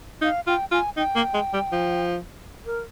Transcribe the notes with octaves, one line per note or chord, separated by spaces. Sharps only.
D#4 F5
F4 G5
F4 G#5
D#4 G5
A#3
G#3
G3
F3
A#4